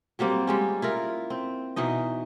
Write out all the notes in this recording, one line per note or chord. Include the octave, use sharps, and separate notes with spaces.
F#3 G3 A#3 C4
G3 G#3 C#4
E4 F4 A#4
C4
B2 E3 D#4 D#5